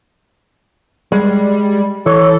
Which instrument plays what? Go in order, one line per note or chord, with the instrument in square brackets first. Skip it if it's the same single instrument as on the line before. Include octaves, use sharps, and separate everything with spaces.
[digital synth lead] G3 [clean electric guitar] G#3
[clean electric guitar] E3 [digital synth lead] A4 [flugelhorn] C#5